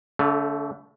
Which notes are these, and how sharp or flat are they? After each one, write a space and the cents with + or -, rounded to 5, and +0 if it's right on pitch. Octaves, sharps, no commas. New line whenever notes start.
D3 -45 A3 +5